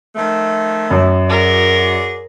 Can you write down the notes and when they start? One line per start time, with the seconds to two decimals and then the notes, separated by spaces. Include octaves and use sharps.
0.16 D#3 F3 A3
0.91 F#2
1.29 F#4 G#4 A#4 D5